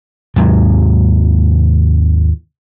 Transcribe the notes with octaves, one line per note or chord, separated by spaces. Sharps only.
D#2 G#2 C3 F#3